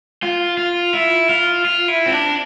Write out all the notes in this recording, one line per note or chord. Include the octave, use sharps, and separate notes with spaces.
F4
F4
E4
F4
F4
E4
C4
D4